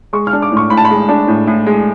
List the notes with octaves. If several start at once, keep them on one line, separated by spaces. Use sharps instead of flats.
G#3 C#6
F6
D4
D6
A2
C#6
A2 B5
A5
B5
G#3
D4
A2
A2
G#3